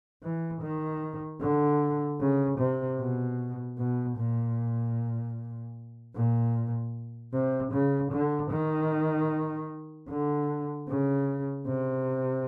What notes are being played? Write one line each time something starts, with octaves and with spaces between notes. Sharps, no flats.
E3
D#3
D3
C#3
C3
B2
B2
A#2
A#2
C3
C#3
D3
D#3
D3
C#3
C3